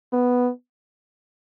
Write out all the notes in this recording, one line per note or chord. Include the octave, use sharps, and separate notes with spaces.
B3